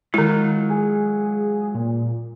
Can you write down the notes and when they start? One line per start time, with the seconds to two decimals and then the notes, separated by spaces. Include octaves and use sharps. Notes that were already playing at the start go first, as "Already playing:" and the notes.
0.14 D#3 F#3 G#3 E4 F4
0.70 G#4
1.74 A#2